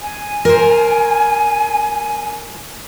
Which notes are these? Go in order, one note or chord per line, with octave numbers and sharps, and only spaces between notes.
G#5
A#4 C5